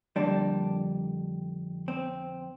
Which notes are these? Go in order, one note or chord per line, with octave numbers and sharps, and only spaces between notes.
F2 D3 G3 A#3 D4
C4